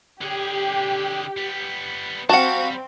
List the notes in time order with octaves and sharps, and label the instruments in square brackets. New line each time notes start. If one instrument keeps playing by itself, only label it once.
[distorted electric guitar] D3 G#4 [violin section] G4
[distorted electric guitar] G3 B3
[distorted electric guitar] G3 [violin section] C4 [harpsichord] F#4 F5 [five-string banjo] F#5 A5